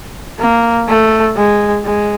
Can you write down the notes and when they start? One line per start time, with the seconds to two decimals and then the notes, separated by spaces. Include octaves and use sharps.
0.40 A#3
0.89 A3
1.37 G#3
1.85 G#3